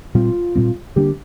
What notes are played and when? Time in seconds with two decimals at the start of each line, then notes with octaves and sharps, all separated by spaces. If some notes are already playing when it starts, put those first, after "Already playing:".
0.15 A#2 G3 C4 F4
0.56 A#2 G3 C4
0.96 D3 G3 A#3 D4 G4